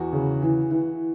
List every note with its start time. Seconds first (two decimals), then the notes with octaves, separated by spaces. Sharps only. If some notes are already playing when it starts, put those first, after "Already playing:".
Already playing: E2 F#4
0.13 C#3
0.42 E3
0.71 E3